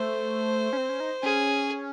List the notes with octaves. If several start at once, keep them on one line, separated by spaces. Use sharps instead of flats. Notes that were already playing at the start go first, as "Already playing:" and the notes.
Already playing: A3 C5
C#4
C4
C#4
D#4
C#4 G#4